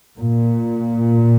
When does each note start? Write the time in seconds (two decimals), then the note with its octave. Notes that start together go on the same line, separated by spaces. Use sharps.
0.18 A#2